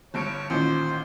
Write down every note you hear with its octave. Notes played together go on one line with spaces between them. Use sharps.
G1 G2 C#5 D7
A1 A#2 D#3 C5